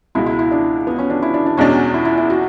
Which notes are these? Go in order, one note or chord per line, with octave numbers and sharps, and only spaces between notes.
C#2 B2 G#3 E4
E4
E4
D4
B3
C#4
D4
E4
D4
D4
E2 B2 G#3 C#4 D4
E4
E4
E4
F#4